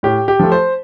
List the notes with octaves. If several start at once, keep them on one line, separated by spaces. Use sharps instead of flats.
A2 G4
G4
F3 A3
C5